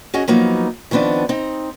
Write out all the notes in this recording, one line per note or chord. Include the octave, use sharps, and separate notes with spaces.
C#4 F#4 G#4 D#5 F#5
F3 F#3 A#3 B3 D#4
D#3 F3 B3 C4 D4
C4 D#4